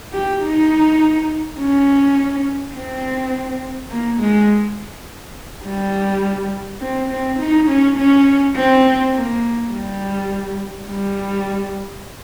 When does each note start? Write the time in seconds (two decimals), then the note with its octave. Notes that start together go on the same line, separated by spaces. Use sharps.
0.13 G4
0.43 D#4
1.59 C#4
2.75 C4
3.91 A#3
4.20 G#3
5.65 G3
6.81 C4
7.10 C4
7.39 D#4
7.68 C#4
7.97 C#4
8.56 C4
9.14 A#3
9.72 G3
10.87 G3